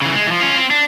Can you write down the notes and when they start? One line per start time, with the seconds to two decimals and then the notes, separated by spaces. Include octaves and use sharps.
0.02 C#3 E3
0.15 G#3
0.27 E3 F3
0.41 C#4 F4
0.57 C4
0.71 D4